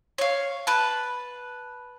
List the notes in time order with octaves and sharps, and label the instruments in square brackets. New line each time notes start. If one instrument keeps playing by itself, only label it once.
[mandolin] C#5 F5
B4 A5